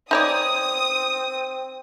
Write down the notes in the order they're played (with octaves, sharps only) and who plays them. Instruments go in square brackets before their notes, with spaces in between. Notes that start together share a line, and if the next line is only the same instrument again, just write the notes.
[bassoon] C4 [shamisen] D#4 C#5 D5 [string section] D#6